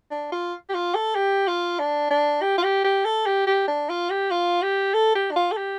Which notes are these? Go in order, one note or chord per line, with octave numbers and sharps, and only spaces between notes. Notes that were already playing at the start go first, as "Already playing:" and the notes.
D4
F4
G4
F4
A4
G4
F4
D4
D4
G4
F4
G4
G4
A4
G4
G4
D4
F4
G4
F4
G4
A4
G4
D4
F4
A4
G4